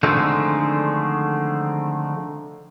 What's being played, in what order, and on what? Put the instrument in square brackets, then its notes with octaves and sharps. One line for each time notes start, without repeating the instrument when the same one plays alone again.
[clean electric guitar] D3 D#3 F3 G#3 A3 C4